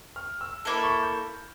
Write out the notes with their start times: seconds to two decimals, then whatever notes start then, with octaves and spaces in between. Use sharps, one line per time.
0.16 F6
0.41 E6
0.65 A#3 E4 A4
0.84 C#6
1.03 G6